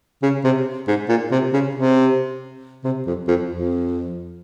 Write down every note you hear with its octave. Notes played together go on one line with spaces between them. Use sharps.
C#3
C3
G#2
A#2
C3
C#3
C3
C3
F2
F2
F2